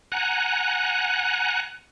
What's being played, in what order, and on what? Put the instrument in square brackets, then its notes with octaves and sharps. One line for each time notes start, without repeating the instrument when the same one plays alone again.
[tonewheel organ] F#5 G#5 A#5 F#6